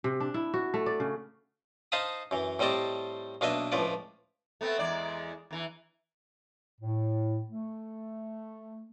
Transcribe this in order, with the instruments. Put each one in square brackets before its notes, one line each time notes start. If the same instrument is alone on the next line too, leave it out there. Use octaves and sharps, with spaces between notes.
[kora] C3
D4
E4
F#4
A3
D5
C#3
[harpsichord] D#4 C5 F5 A5 B5 D#6
F#2 E3
A2 G3 C4 D#5 A5 D6
B1 A#3 D4 B4 D#5 E5
C#2 A2 F3 B4 D5
[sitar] A3 B3 C4
E2 G#3 D5
E2 E3
[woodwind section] A2
A3